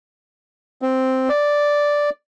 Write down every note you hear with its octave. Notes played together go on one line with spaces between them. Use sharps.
C4
D5